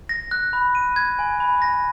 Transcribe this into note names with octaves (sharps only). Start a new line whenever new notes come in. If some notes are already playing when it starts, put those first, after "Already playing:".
A#6
F#6
B5
D#7
G#6
G#5
B5
A#6